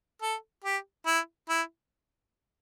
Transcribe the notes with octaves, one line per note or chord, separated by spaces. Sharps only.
A4
G4
E4
E4